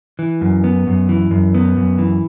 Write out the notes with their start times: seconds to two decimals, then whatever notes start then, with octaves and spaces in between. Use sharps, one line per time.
0.19 E3
0.41 F#2
0.64 B3
0.87 F#2
1.09 E3
1.31 F#2
1.55 B3
1.77 F#2
1.98 E3